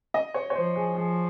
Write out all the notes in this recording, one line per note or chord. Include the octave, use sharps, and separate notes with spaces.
D#5
C#5
C#5
F3 C5
G#4
F3 G#4